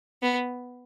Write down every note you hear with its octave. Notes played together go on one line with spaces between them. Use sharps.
B3